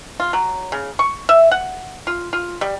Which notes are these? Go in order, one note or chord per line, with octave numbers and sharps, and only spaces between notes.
F4
F#3
C#3
C#6
E5
F#5
F4
F4
G3